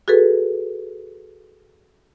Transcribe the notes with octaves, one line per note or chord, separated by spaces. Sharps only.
F#4 G#4 A4 B4